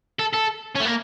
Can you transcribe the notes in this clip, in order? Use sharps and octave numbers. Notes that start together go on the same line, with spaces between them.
A4
A4
C#4
A3
A#3